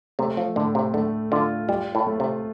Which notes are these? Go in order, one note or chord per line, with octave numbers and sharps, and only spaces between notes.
C3 A3
F3
A2 D3
C3
D3 A3
D3 F4
G3 F4
A2
A3
C3